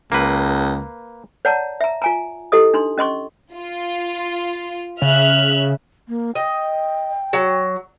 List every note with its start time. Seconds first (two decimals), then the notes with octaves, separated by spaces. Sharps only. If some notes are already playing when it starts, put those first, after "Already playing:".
0.12 C#2 A#3 B4
1.45 C#5 D5 F#5 A5 A#5
1.81 E5 A#5
2.02 F4 G#5 A#5
2.52 E4 G4 A4 D#5 D#6
2.74 D4 D#4 C6
2.98 C#4 D#5 C6 C#6
3.54 F4
5.02 C#3 E5 F6 F#6
6.09 A#3
6.35 D#5 G5
7.33 F#3